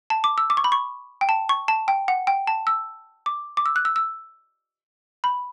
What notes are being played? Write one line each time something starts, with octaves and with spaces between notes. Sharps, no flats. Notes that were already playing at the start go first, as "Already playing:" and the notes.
A5
D6
E6
D6
C#6
B5
C#6
G5
A5
C#6
A5
G5
F#5
G5
A5
E6
D6
D6
E6
F#6
E6
E6
B5